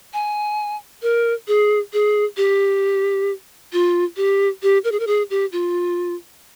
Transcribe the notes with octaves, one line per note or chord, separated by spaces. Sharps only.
G#5
A#4
G#4
G#4
G4
F4
G4
G4
A#4
G#4
A#4
G#4
G4
F4